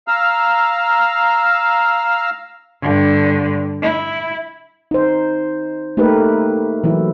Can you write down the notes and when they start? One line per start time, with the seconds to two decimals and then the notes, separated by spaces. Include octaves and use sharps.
0.08 F5 A#5 E6 F6
2.82 G2 D3
3.82 E4
4.91 D#4 C5
5.97 A3 A#3 D#4 G4 A#4 B4
6.84 E3 F#3 E4